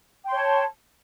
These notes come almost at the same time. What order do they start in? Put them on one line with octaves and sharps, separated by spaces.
G5 C6 C#5 A5